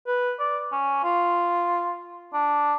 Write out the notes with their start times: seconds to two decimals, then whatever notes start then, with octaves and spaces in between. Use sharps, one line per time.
0.07 B4
0.39 D5
0.72 C#4
1.03 F4
2.33 D4